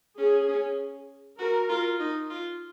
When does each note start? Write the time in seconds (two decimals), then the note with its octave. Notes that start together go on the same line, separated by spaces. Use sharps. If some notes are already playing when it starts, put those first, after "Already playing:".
0.18 C#4 G#4
0.48 C#4
1.39 F#4 A#4
1.69 F4
2.00 D#4
2.30 F4